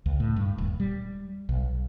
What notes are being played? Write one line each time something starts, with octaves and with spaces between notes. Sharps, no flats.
C#2
A2
G2
D#1
G3
B1